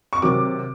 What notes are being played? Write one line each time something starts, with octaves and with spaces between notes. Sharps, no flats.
C#6
C3 D#3 F#3 D6